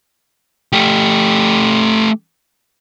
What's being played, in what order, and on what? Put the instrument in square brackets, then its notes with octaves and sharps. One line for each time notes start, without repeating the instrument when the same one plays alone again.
[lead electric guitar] A3 G4